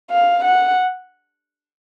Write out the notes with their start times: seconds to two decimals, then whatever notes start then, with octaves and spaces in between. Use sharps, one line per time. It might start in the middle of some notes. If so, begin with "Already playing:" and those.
0.11 F5
0.44 F#5